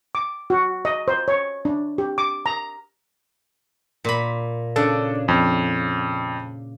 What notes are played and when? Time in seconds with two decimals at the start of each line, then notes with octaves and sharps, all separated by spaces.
0.15 D6
0.50 F#4
0.85 D#5
1.08 C5
1.28 C#5
1.65 D4
1.98 G4
2.18 D6
2.46 A#5
4.05 A#2 B5
4.76 C#3 D4 A4
5.28 F2